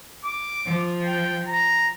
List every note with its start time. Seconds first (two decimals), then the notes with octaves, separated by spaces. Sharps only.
0.24 D6
0.66 F3
1.04 G5
1.48 A#5